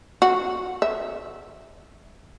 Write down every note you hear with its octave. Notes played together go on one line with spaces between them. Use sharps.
F#4
E5